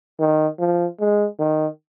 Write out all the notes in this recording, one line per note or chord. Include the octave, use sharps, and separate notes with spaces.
D#3
F3
G#3
D#3